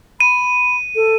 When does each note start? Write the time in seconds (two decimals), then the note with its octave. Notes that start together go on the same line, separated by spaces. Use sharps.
0.20 B5 D#7
0.96 A4